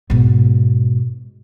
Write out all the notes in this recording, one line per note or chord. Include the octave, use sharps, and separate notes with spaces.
G#2 B2